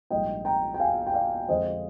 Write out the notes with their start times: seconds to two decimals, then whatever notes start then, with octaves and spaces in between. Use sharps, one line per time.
0.10 A#1 G#2 G3 A#3 D4 D#5 G5
0.45 G5 A#5
0.74 G5
0.80 F5 G#5
1.07 G5
1.14 D5 F5
1.48 F2 D3 G#3 C5 D#5